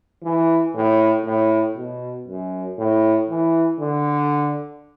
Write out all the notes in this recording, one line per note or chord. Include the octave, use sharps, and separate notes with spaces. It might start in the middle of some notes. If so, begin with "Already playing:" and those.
E3
A2
A2
B2
F#2
A2
E3
D3